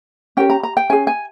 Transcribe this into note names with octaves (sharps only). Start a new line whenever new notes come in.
C#4 G4 A#4 G5
A#5
A#5
G5
C#4 G#4 G#5
G#5